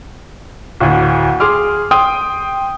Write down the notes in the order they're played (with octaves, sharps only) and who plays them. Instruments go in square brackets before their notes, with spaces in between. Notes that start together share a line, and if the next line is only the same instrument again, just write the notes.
[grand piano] D1 D2
G#4 C6 D6 F6
G5 C6 D#6